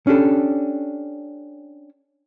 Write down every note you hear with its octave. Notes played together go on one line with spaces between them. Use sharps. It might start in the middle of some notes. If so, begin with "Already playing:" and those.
C#4 D4 G4 A4